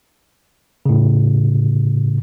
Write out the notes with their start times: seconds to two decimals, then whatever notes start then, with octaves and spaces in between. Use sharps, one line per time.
0.86 A2 C#3